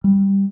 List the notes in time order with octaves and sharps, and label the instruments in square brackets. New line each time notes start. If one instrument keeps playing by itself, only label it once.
[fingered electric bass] G3